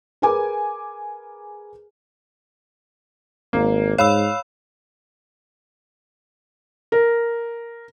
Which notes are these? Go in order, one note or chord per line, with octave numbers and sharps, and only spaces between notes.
G#4 A#4 B4 G#5 D6
G#1 A#3
G#2 C#5 F5 B5 E6
A#4